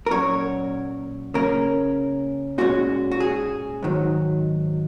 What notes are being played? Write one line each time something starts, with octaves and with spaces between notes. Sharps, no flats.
A#4
A#2 F#3 C#4 C#5
C#3 A#3 C#4 A#4
A#2 G#3 C#4 F#4
F#4
G#4
G#2 D#3 F#3